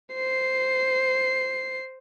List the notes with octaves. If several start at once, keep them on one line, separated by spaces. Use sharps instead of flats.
C5 C7